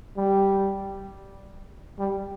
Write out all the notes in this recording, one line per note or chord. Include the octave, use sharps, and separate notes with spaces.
G3
G3